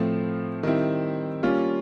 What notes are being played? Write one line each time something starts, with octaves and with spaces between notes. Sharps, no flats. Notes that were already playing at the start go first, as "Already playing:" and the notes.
Already playing: A2 F3 A3 C4
D#3 G3 C4 E4
G3 A#3 C#4 F4